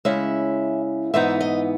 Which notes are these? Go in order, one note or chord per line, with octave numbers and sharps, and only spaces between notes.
C#3 G#3 C#4 E4 E5
G#2 E3 B3 D#4 E5
D#5